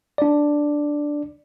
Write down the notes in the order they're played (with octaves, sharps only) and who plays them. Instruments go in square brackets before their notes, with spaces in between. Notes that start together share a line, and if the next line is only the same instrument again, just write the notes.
[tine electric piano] D4 D5